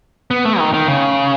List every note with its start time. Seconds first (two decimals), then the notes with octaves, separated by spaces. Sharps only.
0.31 B3
0.45 A3
0.59 D#3
0.74 D#3
0.88 C#3